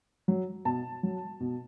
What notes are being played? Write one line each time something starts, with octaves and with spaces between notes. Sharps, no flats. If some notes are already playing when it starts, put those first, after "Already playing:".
F#3
B2 A5
F#3
B2